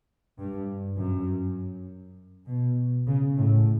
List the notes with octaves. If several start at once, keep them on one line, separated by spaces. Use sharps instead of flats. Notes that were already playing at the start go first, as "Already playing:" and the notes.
G2
F#2
B2
C#3
A2